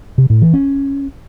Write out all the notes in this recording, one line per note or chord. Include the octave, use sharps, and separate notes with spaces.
C3
A2
E3
C#4